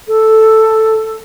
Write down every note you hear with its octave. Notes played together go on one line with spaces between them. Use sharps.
A4